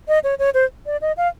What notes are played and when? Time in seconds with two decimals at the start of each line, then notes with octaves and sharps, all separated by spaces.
0.08 D#5
0.24 C#5
0.39 C#5
0.54 C5
0.86 D5
1.01 D#5
1.17 F5